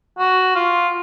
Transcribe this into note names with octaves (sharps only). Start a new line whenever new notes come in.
F#4
F4